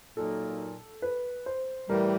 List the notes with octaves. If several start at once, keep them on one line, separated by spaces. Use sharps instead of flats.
A#2 F#3 A#3 D#4 A4
B4
C5
A2 E3 G3 A#4